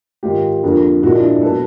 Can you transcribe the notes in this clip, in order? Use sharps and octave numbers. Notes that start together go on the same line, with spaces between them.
G#2 D#3 G#3 F4 G4
F2 D3 F3 A#3
A#2 F3 G#3 E4 F#4
D4 E4
B2 F#3 A#3 A4 B4